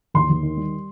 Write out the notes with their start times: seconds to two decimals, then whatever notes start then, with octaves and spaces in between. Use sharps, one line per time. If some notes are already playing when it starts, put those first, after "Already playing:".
0.14 D#2 C6
0.29 D#2
0.43 D#3
0.57 G3